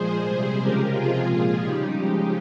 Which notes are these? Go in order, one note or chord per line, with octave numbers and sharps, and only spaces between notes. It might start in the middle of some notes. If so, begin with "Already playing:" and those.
Already playing: A#2 F3 G#3 G#4 C5
C3 G3
C#3 F3 G#3 G4 A#4
C3 F3 G#3 F4 G#4
A#2 F3 G#3
C#3 G3 D#4 G4
C#3 F3 G#3